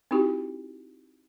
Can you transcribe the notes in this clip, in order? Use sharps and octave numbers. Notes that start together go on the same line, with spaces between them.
C4 D#4 E4 F#4 G4